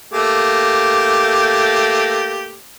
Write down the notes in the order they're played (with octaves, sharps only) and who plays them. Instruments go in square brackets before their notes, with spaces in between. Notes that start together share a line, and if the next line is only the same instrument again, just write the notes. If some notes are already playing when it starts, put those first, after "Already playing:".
[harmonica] A3 A#3 G4